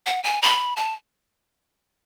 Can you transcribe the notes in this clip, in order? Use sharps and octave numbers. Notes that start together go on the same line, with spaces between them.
F#5
G#5
B5
A5